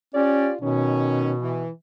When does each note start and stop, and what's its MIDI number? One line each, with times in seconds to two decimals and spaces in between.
0.14 0.50 61
0.14 0.55 65
0.14 0.55 67
0.14 0.55 74
0.61 1.68 47
0.61 1.32 51
0.61 1.32 61
1.41 1.70 52